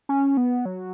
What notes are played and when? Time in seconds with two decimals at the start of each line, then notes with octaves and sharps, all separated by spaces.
0.09 C#4
0.37 B3
0.65 F#3